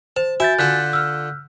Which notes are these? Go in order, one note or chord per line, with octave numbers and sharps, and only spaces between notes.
C5 A5
F#4 E5 G#5 G6 A6
D3 F4 A4 F#6 G6 B6
E6 F6